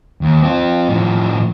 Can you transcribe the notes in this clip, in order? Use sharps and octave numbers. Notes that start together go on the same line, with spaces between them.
D#2
C4 F4
A2 F3